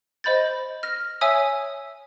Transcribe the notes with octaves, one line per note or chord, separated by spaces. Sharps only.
C5 D#5 B5 G6 A6
F6 A#6
C#5 E5 G#5 D#6 E6